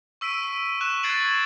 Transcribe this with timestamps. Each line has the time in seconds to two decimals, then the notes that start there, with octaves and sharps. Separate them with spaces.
0.21 C#6 E6 B6 D7 D#7
0.81 C#6 F#6 E7
1.03 F#6 G#6 A6 C7 D7 F#7